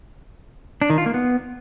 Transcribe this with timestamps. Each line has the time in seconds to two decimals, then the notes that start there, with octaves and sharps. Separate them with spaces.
0.82 D4
0.90 D#3
0.98 F4
1.06 A#3
1.14 B3